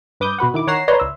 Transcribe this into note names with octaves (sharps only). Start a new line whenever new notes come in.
G2 B4 D6 D#6 G6
B2 F#4 B4 F#5
D#3 E4 D6
D#3 C#5 F#5 A#5 C7 E7
B4 C#5 D5 A#5 C6
C#2 E5